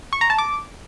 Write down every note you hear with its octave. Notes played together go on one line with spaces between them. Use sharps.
C#6
A#5
A5
D6